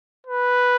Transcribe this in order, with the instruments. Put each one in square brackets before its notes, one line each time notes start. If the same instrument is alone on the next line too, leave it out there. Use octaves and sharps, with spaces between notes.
[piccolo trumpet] B4